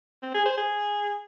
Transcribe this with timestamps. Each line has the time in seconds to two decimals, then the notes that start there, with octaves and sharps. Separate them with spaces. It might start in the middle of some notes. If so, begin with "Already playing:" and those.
0.23 C4
0.34 G#4
0.46 C5
0.57 G#4